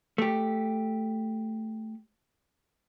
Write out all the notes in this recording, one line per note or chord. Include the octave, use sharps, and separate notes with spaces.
A3 G4